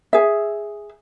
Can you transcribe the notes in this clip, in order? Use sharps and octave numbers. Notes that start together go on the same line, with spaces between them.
G#4 E5